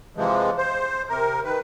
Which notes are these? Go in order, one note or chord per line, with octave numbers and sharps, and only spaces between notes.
C3 E3 F3 G#3
C5
C3 A#4
D#3 B4